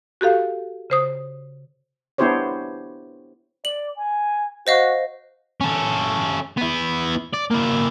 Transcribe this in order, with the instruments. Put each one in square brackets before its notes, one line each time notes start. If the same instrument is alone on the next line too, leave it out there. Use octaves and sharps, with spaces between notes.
[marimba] F#4 G4 A4 F5
C#3 C5 D#6
[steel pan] B3 D4 E4 G4 C5 C#5
[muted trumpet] D5 [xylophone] F#7
[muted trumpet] G#5
[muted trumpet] F#4 [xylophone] C5 D#5 F5
[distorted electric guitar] C#4 A4
B3 E4
D5
A#3 E4